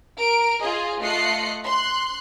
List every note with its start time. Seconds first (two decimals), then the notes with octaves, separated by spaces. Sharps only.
0.17 A#4 D7
0.60 F4 G#4 D#5 G#5
1.01 A3 F4 D#5 F#6 C7 C#7
1.64 C6 F#6